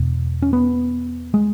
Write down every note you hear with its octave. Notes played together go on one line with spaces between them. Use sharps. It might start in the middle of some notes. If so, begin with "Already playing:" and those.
Already playing: E2 B2
C#4
B3
G#3